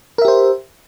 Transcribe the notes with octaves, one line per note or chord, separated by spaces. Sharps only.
G4 A#4 C5 E5